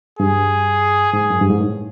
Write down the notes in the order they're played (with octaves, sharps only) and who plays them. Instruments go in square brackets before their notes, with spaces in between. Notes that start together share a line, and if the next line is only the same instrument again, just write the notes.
[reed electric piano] G2 [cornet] G#4
[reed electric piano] G#2 [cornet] G#4
[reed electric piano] F#2
G2
G#2
A2